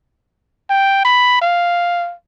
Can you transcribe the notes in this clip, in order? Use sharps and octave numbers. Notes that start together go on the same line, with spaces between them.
G5
B5
F5